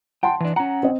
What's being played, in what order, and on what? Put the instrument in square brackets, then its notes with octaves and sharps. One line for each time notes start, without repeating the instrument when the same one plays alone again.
[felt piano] F#5 A5 C6 [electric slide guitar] G5
[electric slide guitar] E3 D4
[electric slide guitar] C#4 F#5 [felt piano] A#5
[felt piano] C4 D#5